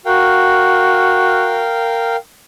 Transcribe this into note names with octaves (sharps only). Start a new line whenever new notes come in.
F#4 A#4 F5 G5